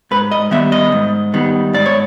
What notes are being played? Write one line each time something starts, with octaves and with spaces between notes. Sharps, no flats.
G#2 B4
D#5
D#3 G3 B3 E5
D#5
G#2
D#3 G3 B3
G#2 D5
C#5